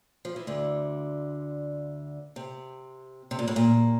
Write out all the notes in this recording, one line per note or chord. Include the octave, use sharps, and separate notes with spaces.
F3
E3
D2 D3
C3
C3
A#2
A2
A#2